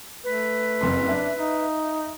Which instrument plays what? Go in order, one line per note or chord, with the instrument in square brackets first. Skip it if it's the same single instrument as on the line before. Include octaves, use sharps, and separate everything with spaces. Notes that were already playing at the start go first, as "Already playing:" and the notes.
[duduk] A3 [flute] B4
[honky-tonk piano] F#1 F2 C6
[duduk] D4 [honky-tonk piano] E5
[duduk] D#4